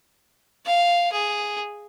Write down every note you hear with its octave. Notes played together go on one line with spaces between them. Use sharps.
F5
G#4